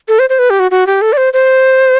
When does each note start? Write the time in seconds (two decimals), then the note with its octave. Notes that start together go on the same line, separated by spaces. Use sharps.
0.08 A4
0.19 C5
0.30 C5
0.39 B4
0.50 G4
0.60 F#4
0.71 F#4
0.87 G4
1.02 A4
1.13 D5
1.17 C5
1.33 C5